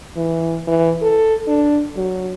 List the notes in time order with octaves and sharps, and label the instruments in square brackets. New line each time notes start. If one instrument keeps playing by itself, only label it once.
[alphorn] E3
E3
A4
D4
F#3